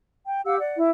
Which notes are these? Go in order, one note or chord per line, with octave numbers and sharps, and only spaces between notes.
G5
G4 F5 F#5 E6
D5 F#5
E4